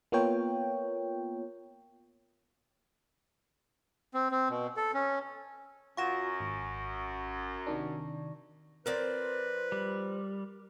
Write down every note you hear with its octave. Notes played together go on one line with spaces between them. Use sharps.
A#3 B3 F4 A#4 C#5 G5
C4
C4
B2
A4
C#4
F#2 F4 F#4 C#6 A#6 E7
G#1
C3 D#3 D4
F3 C4 A#4 B4 D5
G3